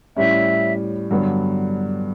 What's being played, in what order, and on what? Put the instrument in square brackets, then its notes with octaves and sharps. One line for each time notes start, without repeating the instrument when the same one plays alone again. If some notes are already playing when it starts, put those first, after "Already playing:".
[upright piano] A2 G3 C#4 [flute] E5
[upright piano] G2 D3 F#3 B3